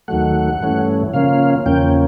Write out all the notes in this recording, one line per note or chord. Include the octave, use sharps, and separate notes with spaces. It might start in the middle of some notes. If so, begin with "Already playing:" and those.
D#2 D#3 F#3 A3 F#5
G2 E3 A3 C#4
C#3 F3 A#3 C#4 F5
E2 C#3 F3 A#3 C#4 G5